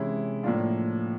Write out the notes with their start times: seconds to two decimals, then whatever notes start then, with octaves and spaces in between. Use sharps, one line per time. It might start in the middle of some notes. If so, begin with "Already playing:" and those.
Already playing: C3 E3 G#3 C#4 E4
0.43 A2 F3 A#3 D4 F4